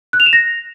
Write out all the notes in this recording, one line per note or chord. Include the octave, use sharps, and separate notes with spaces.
F#6
F7
E7
A#6